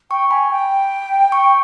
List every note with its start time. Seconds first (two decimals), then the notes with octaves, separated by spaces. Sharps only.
0.11 G5 C#6
0.30 G#5 B5
0.50 G5
1.32 C#6